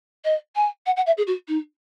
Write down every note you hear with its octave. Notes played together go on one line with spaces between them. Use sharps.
D#5
G#5
F#5
F#5
E5
G#4
F#4
D#4